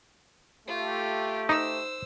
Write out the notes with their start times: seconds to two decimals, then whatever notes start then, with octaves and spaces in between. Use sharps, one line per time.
0.67 A3 F4 G4
1.49 D#4 C5 E6